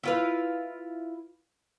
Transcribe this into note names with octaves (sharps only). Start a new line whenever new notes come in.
E4 F4 B4